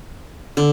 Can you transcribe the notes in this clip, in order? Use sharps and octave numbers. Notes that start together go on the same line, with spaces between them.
D3